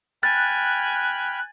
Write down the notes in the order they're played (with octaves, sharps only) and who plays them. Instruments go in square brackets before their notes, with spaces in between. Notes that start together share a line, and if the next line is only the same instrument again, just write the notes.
[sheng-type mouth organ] G5 B5 F6 [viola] G#5 [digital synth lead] F#6 [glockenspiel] A6